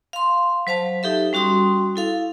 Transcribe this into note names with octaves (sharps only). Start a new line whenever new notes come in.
F5 C6
F#3 C5 F5 A5
D#4 G4 A4 E5
G3 C#4 F#4 C6 D#6
E4 A4 F5